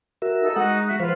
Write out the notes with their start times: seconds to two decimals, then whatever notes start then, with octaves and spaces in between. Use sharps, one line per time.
0.22 F#4 A#4 E5
0.40 D#4 A4 E6
0.56 G#3 D#4 F#4 F#5 D#6
0.87 F#4 E5 F#6
1.00 F3 F4 B4 C5 F5